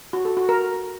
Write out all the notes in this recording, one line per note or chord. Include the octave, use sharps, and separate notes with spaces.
F#4
A4
F#4
A#4